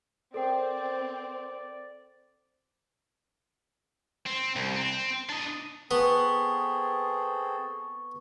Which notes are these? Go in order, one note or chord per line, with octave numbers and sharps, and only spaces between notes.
C4 A4 A#4 C5 D5 G5
C4
C2
C4
D4 D#5
B3 C4 G#4 A4 C#6